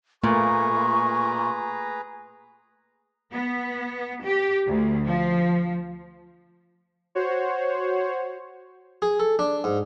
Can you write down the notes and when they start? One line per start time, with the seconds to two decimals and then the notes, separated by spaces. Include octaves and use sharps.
0.23 A#2 A3 A#3 G#4 B4 A#5 C#6
3.33 B3
4.26 G4
4.67 D2
5.08 F3
7.15 F#4 C5 C#5
9.02 G#4
9.20 A4
9.39 D4
9.64 G#2